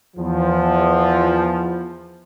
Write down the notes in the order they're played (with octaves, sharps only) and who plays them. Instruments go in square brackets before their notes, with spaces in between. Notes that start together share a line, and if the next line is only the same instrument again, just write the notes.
[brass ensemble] E2 F3